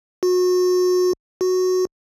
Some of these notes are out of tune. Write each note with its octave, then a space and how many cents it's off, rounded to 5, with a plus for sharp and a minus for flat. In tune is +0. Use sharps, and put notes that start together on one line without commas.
F#4 -30
F#4 -5